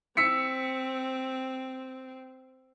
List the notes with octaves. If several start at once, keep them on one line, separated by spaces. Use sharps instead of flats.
C4 E6 B6 C#7